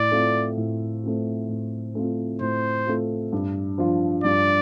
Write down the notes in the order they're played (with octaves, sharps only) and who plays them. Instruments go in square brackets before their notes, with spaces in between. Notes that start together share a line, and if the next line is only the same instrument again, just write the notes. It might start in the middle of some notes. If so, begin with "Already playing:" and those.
Already playing: [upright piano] A2 [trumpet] D5
[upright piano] A3 C4 F4
A2
A3 C4 F4
A2
A3 C4 F4
[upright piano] A2 [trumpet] C5
[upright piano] A3 C4 F4
G2
F3 D4 F4
[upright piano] G2 [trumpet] D5